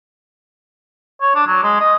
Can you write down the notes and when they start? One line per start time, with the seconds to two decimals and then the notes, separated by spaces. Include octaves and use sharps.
1.22 C#5
1.35 D4
1.47 F#3
1.63 G#3
1.80 D#5